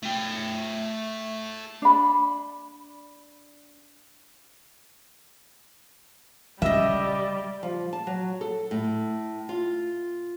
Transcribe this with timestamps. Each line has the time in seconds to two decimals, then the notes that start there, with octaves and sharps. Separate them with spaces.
0.02 A3 G5
1.82 D4 B5
6.62 C#3 G3 D#5 E5
7.63 F3
7.93 A5
8.07 F#3
8.41 A4
8.71 A2
9.49 F4